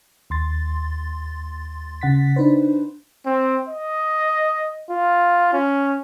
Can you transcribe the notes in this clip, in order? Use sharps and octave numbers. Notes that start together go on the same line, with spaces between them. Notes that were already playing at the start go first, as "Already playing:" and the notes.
D#2 C6 A6
C#3 F#5 A6 B6
D4 D#4 B4 C5
C4
D#5
F4
C#4